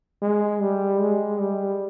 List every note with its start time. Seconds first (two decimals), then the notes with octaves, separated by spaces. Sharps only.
0.22 G#3
0.60 G3
1.00 G#3
1.39 G3